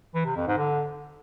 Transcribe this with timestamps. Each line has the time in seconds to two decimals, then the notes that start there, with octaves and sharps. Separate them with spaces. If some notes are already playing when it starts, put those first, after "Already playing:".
0.15 E3
0.26 C3
0.36 F2
0.47 G#2
0.58 D3